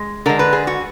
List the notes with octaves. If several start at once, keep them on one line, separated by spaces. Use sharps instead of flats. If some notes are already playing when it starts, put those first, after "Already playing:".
Already playing: G#3
D3 G#3 A#4
B4
G#4
F#4